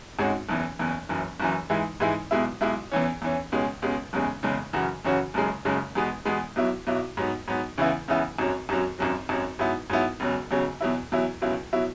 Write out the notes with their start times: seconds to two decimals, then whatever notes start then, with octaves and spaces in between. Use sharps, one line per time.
0.19 G#1 G#2 G#3 C#4 F#4
0.49 F#1 E2 E3
0.79 F#1 E2 E3
1.09 F#1 F#2 E3
1.40 F#1 F#2 E3
1.70 G#2 E3 G#3 E4
2.00 G#2 E3 G#3 E4
2.31 B1 B2 G#3 E4
2.61 B1 B2 G#3 E4
2.92 E2 E3 C#4
3.22 E2 E3 C#4
3.52 C#2 B2 G#3 C#4
3.82 C#2 B2 G#3 C#4
4.13 F#1 E2 C#3 G#3
4.43 F#1 E2 C#3 G#3
4.73 F#2 C#3 E3 C#4 F#4
5.05 F#2 C#3 E3 C#4 F#4
5.34 F#1 F#2 C#3 G#3
5.65 F#1 F#2 C#3 G#3
5.95 E2 B2 G#3 B3
6.26 E2 B2 G#3 B3
6.56 B1 B2 F#3 E4
6.87 B1 B2 F#3 E4
7.17 G#2 F#3 B3
7.48 G#2 F#3 B3
7.78 C#2 C#3 E3 B3 E4
8.08 C#2 C#3 E3 B3 E4
8.38 G#1 F#2 F#3
8.69 G#1 F#2 F#3
8.99 G#1 F#2 F#3
9.29 G#1 F#2 F#3
9.59 G#2 F#3 B3 E4
9.90 G#2 F#3 B3 E4
10.20 E1 E2 C#3 F#3
10.51 E1 E2 C#3 F#3
10.81 E2 B2 F#3 E4
11.12 E2 B2 F#3 E4
11.42 C#2 B2 F#3 E4
11.73 B2 F#3 E4